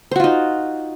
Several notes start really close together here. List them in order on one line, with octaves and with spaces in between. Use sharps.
C5 F#4 F4 D#4